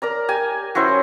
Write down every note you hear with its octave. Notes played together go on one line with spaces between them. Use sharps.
A#4 D5 A#5
G4 G#5
F#3 C#4 E4 C5